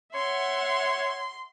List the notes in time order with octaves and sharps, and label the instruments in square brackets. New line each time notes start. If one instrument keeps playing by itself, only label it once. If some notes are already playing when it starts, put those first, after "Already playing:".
[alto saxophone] C#5 [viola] E5 F#5 [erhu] C6